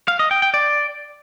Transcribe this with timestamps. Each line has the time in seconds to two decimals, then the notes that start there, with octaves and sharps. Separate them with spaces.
0.08 F5
0.19 D#5
0.31 G5
0.42 G5
0.54 D5